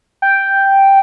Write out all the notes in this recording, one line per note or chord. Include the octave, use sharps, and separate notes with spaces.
G5